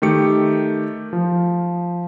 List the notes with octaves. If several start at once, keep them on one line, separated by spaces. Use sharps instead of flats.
D#3 A3 G4 C#7
F3